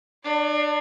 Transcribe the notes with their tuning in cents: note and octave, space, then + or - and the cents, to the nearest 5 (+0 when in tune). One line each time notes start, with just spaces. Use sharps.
D4 +35 D5 -30